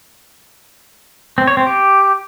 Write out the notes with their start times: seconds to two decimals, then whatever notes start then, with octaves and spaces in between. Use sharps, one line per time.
1.38 C4
1.47 C#5
1.57 C4
1.67 G4